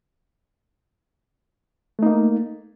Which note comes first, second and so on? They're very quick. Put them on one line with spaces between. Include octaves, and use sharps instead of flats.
A3 D#4 A#3